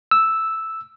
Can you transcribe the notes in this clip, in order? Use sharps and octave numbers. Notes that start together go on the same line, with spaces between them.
E6